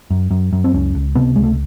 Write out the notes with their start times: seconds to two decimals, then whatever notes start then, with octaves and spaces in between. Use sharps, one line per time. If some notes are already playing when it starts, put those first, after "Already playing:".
0.11 F#2
0.31 F#2
0.53 F#2
0.64 C4
0.74 C#2 C#4
0.95 C#2
1.15 C3 B3
1.36 C#2 G#3
1.43 A3